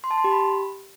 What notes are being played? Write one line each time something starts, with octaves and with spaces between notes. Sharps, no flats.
C6
A5
C6
G4
B5